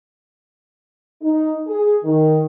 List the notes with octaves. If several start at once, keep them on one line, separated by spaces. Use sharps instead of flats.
D#4
G#4
D#3